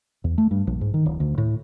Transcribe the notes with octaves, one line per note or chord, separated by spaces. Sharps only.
E2
A3
G2
A#1
G#2
D#3
D1
D2
A2